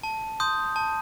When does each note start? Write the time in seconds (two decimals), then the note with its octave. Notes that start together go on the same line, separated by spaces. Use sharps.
0.03 A5
0.40 C6 D#6 G6
0.76 A5